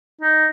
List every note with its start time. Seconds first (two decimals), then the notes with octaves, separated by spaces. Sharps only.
0.21 D#4